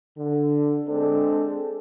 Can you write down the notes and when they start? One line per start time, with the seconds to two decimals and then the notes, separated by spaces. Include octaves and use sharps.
0.17 D3
0.87 G#3 C4 D4 A4